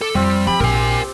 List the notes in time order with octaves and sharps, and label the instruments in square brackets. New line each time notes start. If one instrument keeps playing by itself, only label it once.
[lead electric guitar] A4 [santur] D6
[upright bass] F2 [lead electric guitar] G3 [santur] C4 F4
[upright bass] F3 [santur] G4 [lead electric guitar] B5
[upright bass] A#1 [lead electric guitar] A#4 G#5